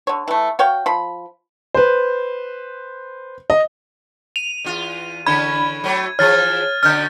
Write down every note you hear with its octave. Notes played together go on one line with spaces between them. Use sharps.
D3 C#5
E3 A3
F#4 C#5 F5 G5
F3 B5
B4 C5
D#5
D#7 F7
E2 F4
D3 E3 C#4 B5 G#6
F#3 A3 C#5
E3 F3 G#4 C#5 F6 A6
B2 D3 C#4 F6 G6